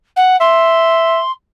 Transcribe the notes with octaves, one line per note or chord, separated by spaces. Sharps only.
F#5
E5 C6